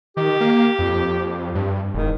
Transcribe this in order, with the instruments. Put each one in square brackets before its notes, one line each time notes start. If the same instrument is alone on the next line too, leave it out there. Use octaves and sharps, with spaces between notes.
[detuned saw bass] D#3 [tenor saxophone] G4
[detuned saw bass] A#3
F2
G2
[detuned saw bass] E1 [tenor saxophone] D#3